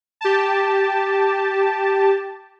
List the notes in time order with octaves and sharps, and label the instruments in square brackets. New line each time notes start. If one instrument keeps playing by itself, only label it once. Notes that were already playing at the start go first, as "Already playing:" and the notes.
[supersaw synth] G4 A5